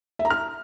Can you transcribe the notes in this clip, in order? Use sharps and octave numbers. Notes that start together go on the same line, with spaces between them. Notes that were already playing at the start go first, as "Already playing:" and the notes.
E5
A#5
F6